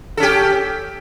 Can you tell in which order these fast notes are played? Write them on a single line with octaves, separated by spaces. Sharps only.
A4 C#4 G4